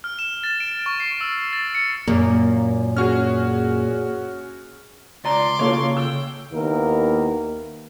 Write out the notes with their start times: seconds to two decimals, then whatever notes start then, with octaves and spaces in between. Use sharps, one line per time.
0.04 F6
0.19 E7
0.44 A6
0.60 D7
0.86 C#6
1.00 C7
1.21 E6
1.53 A6
1.75 C#7
2.08 F#2 A#2 A#3
2.96 C#4 F#4 G#4 F6
5.24 C#2 D5 A#5 C6 D6
5.59 C#3 A#3 F4 A4 C#5
5.97 G5 E6
6.52 D#2 A#3 B3 E4 A#4